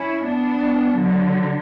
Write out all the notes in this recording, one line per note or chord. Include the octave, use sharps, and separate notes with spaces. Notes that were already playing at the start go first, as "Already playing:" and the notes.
Already playing: C#4 E4
B3 D4
D3 F#3